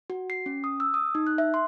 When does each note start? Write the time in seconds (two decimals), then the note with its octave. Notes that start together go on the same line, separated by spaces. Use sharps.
0.10 F#4
0.30 C7
0.46 C#4
0.64 D#6
0.80 E6
0.94 D#6
1.15 D#4
1.27 F#6
1.38 E5
1.54 C6